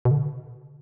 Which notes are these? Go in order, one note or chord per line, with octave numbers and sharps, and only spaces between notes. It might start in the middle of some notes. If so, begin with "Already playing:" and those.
B2
D3